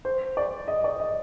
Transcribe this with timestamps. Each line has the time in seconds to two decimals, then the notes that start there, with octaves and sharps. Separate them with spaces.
0.05 C5
0.37 D5
0.68 D#5
0.84 D5
1.00 D#5